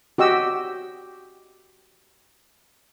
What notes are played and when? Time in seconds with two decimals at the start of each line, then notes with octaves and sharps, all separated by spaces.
0.18 F#4 G4 D#5 E6